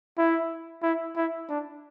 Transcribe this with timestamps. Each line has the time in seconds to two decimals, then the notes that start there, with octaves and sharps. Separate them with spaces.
0.18 E4
0.83 E4
1.16 E4
1.49 D4